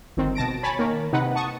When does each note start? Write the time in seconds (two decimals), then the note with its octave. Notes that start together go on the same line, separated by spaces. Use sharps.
0.17 G1 D#3 C4
0.35 B2 A5 A#6 D7
0.63 C#5 G#5 A5 B5 C#6 A6
0.79 D#3 A#3 A#4 C#5
1.13 C3 D#4 B4 F#5
1.35 F#5 A5 C#6 D#6